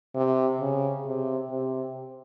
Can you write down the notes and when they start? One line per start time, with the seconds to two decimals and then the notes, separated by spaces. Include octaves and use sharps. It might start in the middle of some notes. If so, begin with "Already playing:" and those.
0.15 C3
0.60 C#3
1.06 C3
1.50 C3